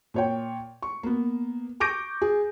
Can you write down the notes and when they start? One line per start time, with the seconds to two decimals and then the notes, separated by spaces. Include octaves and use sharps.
0.14 A#2 C#5 G5
0.83 C#6
1.03 A#3 B3
1.80 C#6 D6 G6 A#6 D7
2.22 G#4